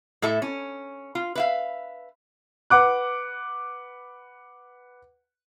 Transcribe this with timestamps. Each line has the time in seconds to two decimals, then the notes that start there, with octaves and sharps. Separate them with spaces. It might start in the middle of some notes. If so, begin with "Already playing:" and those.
0.22 A2 E4 A4 E5
0.42 C#4
1.15 F4
1.35 B4 E5 F5
2.70 B4 F#5 D6 F#6